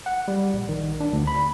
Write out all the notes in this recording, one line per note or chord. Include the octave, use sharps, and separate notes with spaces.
F#5
G3
A#1
D#3
D4
D2
B5